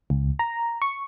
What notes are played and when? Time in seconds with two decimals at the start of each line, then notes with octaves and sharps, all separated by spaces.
0.10 C#2
0.39 A#5
0.82 C#6